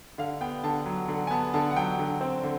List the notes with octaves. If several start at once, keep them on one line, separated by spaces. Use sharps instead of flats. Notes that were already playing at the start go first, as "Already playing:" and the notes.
D3 F5
B3 G5
D3 A5
F#3
D3
G#5
B3 A5
D3 A5
F#5
F#3 G5
D3
C4
D3